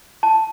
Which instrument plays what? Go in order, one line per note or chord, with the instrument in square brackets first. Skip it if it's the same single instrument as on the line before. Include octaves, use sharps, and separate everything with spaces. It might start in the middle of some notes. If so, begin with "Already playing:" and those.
[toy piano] A5